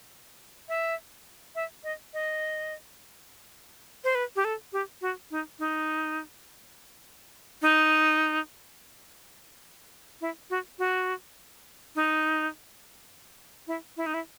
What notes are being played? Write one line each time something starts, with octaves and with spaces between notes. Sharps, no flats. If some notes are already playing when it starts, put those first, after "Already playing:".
E5
E5
D#5
D#5
C5
B4
G4
A4
G4
F#4
D#4
D#4
D#4
E4
F#4
F#4
D#4
E4
E4
D#4
E4